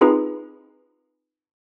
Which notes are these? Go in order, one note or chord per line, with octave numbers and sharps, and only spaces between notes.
C4 D#4 F4 G#4 B4